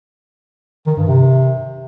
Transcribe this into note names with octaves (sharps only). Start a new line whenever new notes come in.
D#3
G2
C3